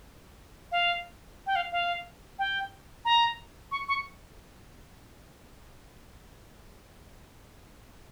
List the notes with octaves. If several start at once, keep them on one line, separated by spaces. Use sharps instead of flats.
F5
G5
F5
F5
G5
A#5
C#6
C#6